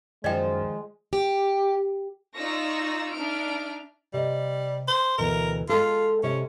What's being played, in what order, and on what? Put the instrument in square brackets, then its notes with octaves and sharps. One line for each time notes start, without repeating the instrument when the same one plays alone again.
[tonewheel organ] F#2 [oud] D#3 F3 [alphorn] G#3 [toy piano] D5 D#5 G5
[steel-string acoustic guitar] G4
[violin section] D#4 F4 D5 C#6 E6 A#6
D4 D#4 E5 F6 D7
[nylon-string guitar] C3 D#5 [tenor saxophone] G3
[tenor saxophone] C5
[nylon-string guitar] D2 B2 E3 [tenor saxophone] A#4
[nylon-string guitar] G#3 A4 [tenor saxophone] F4
[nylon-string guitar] C3 G#3 E5 [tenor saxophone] C#4